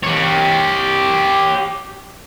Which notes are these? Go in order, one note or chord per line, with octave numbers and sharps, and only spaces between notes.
G4 C#5